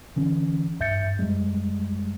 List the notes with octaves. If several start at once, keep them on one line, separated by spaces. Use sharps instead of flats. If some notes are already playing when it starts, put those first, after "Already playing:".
D3 E3 C#4
A1 G2 E5 G6 A6 C#7
F#2 G3 G#3